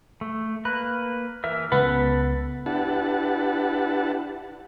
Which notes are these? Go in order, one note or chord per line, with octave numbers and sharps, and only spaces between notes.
A3
A#3 B4 F#6
E3 A#4 E5
C#2 B3 A4 F#5 B5
D4 E4 G4 B4 F#5 A5